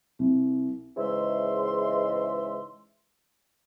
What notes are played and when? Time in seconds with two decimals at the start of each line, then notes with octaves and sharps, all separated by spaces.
0.19 C2
0.97 G#2 C#3 E3 G#3 E5 C6